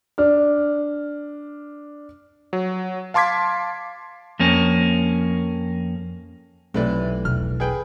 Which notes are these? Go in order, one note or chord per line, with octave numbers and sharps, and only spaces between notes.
D4 F6
F#3
F5 A5 C6 D6 G#6 B6
F2 A#3 C#4
B1 C3 E3 A3 B4 D5
E1 F6
G#4 B4 G5